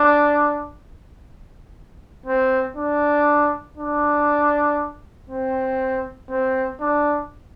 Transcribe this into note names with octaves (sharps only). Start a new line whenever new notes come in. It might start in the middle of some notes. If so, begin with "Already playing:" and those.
Already playing: D4
C4
D4
D4
C4
C4
D4